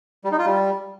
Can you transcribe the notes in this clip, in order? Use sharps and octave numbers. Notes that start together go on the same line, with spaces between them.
G3
D#4
F4
G3